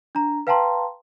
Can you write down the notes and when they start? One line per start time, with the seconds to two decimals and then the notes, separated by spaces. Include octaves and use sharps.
0.15 D4 A#5
0.47 B4 F5 G5 A5 A#5 C6